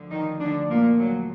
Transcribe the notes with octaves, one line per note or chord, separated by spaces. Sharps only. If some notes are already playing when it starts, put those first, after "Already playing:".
Already playing: D2 D3 F3
D#3 D#4
D3 D4
A#2 A#3
F#3